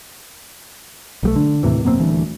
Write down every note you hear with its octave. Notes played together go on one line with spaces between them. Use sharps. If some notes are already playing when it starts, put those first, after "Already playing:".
B1 G3 A3
D3
D#2 A2 C3 E3
F#2 B2 A#3 C4
D#1 D2 E3